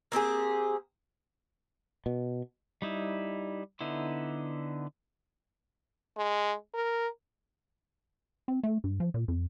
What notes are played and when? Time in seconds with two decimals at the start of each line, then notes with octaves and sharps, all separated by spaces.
0.12 A#3 C4 G4 G#4
2.06 B2
2.82 G3 D#4 E4
3.81 D3 B3 D#4 E4
6.17 G#3
6.74 A#4
8.48 C4
8.63 A3
8.84 G2
9.00 F3
9.14 A#2
9.28 F2